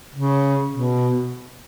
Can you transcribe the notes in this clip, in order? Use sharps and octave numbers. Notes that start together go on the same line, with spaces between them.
C#3
B2